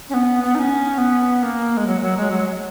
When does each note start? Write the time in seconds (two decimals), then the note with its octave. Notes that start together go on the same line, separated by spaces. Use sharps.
0.09 C#4
0.14 B3
0.44 B3
0.55 D#4
0.59 C#4
0.98 B3
1.43 A#3
1.77 G#3
1.87 F#3
2.01 F#3
2.17 G#3
2.31 F#3